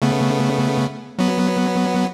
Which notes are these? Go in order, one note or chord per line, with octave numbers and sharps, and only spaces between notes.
C#3 A3 B3
F#3 B3